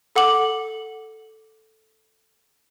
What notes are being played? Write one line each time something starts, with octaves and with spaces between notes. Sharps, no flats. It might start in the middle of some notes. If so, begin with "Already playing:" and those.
A4 F#5 D6 F#7